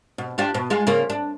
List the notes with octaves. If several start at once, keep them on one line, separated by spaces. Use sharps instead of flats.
B2
D4 F4 G4
B2
G#3 F4
C#3 A#3 F4
D4